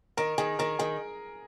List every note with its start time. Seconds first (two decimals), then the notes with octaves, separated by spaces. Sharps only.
0.17 D#3 A#4
0.38 D#3 G#4
0.59 D#3 A#4
0.79 D#3 G#4